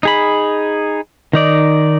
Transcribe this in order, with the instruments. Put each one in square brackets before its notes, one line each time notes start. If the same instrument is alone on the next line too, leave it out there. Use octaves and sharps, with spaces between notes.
[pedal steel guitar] D#4 G#4 B5
D#3 D#4 D5